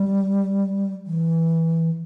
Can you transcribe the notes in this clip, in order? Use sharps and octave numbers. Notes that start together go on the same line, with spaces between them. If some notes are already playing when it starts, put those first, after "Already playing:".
Already playing: G3
E3